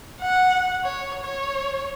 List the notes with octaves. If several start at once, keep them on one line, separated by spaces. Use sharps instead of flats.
F#5
C#5
C#5